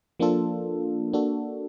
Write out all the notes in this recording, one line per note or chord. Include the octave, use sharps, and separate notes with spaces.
F3 A#3 D4 F4 A4
A#3 D4 F#4 A4